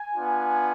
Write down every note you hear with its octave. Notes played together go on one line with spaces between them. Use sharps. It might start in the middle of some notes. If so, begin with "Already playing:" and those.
Already playing: G#5
B3 D4 F4